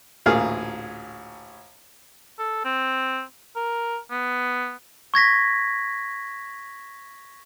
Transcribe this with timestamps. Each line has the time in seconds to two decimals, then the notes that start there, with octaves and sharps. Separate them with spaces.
0.26 A1 D2 A#2 G#4 F5 F6
2.39 A4
2.65 C4
3.56 A#4
4.11 B3
5.14 C#6 G#6 A#6 B6